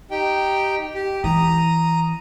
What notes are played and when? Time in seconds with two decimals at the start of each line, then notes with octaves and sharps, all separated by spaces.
0.11 D#4 G4 G5
0.94 G4
1.24 E3 A#5 D#6